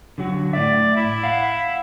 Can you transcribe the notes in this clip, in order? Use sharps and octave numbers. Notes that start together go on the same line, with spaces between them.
D3 F#3 F#4
A2 D5 E5
E4
F5 F#5